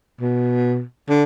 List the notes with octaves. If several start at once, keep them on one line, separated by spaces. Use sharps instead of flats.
B2
D3